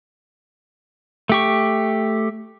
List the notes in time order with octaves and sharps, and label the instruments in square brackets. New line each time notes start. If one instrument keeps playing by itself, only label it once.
[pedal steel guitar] A3 G4 C#6